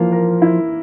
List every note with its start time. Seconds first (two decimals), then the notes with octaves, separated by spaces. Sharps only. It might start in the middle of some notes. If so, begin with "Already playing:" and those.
Already playing: E3 F3 A#3
0.12 A#4
0.42 E4